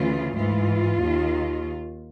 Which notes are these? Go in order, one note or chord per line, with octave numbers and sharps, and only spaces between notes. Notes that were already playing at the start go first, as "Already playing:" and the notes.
Already playing: D2 C#3 E3 F4
G#2 E3 F4
D#2
D#3